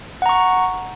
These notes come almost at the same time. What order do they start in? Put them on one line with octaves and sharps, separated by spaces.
F#5 A#5 C#6